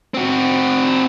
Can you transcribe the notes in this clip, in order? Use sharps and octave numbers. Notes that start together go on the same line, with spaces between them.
C4 F#4